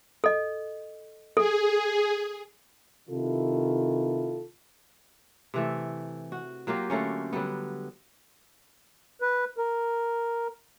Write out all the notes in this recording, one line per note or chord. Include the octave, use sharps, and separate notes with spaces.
A4 D#5
G#4 A4
C3 D#3 E4 F4 A4
C3 E3 A3
F#4
F#3 A#3 F4 G4
D3 A3 A#3 C#4
D3 F#3 G3 B3
B4
A#4